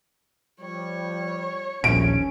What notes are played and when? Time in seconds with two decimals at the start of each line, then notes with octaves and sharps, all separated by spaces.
0.61 F3 G3 C#5
1.84 D#1 A#1 C#4 D7